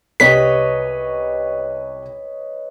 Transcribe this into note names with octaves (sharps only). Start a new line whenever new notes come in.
C2 G4 B4 C#5 D#5 B6